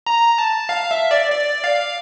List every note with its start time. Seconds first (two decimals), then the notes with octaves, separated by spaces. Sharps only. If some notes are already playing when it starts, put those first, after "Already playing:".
0.07 A#5
0.38 A5
0.69 F5
0.91 E5
1.11 D5
1.32 D5
1.64 F5